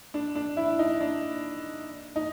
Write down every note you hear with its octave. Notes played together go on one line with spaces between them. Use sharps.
D4
D4
E4
D#4
D4
D#4